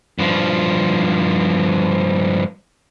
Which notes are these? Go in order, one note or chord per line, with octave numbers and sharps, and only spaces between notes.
G2 F3